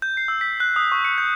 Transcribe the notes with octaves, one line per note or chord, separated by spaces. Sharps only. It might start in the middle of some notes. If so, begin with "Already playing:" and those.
G6
C7
E6
B6
F#6
D#6
C#6
C#7
G6